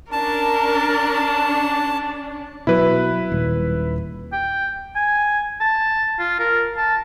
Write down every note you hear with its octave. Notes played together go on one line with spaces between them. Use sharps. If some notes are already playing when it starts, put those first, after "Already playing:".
C#4 D4 A#4 A5
B2 F#3 E4 B4
D#1
G5
G#5
A5
F4
A#4
A5